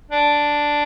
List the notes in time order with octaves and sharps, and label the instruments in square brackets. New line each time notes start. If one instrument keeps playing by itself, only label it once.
[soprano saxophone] D4